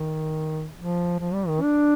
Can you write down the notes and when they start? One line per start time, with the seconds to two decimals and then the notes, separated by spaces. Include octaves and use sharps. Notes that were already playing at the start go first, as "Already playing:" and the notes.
Already playing: D#3
0.77 F3
1.19 F3
1.33 G3
1.48 D#3
1.62 D4